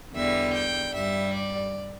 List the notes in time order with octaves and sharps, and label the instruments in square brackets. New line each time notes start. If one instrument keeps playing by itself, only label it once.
[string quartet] E2 D3 G3 E5
G5
G2 G3 E5
D5